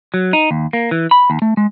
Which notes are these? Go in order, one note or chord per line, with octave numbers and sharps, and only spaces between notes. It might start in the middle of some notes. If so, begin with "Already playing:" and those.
F#3
D#4
D#2
A#3
E3
B5
D#2
A3
G#3